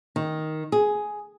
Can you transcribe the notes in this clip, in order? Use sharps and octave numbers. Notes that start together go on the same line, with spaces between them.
D#3
G#4